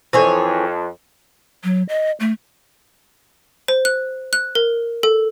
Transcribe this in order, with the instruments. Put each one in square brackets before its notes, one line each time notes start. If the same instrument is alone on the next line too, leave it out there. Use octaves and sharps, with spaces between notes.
[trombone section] F2 [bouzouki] E3 G#4 C#5 [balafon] A4 C5
[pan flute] F#3
D#5
A3
[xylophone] C5
F#6
F#6
A#4
A4